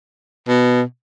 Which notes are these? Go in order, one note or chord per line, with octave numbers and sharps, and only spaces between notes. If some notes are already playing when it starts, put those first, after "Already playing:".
B2